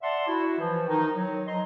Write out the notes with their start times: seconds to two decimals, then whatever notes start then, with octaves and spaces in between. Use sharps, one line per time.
0.02 D5 E5 F#5 A5 C6
0.27 E4 F#4
0.59 E3 F3
0.87 D#3 D#4
1.15 F#3
1.46 F3 D#5 A#5 C6